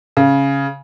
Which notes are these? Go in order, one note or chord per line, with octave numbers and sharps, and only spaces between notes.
C#3